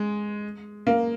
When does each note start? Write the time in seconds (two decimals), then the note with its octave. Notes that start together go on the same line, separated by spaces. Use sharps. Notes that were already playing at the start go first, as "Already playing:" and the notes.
Already playing: G#3
0.87 A#3